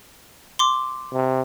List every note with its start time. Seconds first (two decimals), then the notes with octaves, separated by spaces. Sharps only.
0.59 C6 D6
1.13 C3